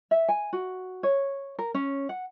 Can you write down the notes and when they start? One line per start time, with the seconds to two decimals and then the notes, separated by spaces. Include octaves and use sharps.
0.11 E5
0.28 G#5
0.53 F#4
1.03 C#5
1.59 A#4
1.74 C#4
2.09 F#5